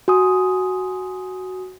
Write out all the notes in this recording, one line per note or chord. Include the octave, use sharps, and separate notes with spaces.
F#4 G#5 D#6